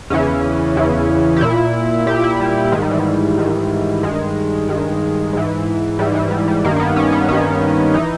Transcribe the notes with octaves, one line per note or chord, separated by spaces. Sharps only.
E2 C#3 E3 C#4
E2 C#3 E3
G4
A#2 E4
A#2 G4
E4
G3
G#2 D#3 G#3
G3
E3
G3
G#2 D#3
G2 D#3 G#3
G2 D#3
G#2 E3
G#2 E3 G3
E3
G3
G3
G2 D#3 A#3
A#3
B3
C#4
B3
G2 D#3 C#4
E3 D#4